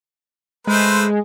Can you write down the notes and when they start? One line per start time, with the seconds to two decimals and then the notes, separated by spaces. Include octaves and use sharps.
0.67 G#3 A3 B4 C5